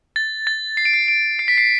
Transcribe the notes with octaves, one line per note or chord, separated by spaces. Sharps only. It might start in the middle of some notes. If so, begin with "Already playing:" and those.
A6
A6
C7
D7
C7
D7
C7
B6
C7